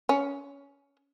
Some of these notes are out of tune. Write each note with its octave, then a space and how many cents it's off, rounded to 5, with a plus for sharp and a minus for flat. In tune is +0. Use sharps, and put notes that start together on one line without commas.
C#4 +20